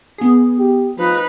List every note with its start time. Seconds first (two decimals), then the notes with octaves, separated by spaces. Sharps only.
0.18 B3 G#4
0.58 G4
0.98 F3 D#4 B4